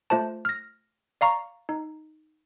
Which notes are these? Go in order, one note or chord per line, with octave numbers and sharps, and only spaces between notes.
A3 F4 C5 A5
F6 A#6
D5 F5 A#5 C#6
D#4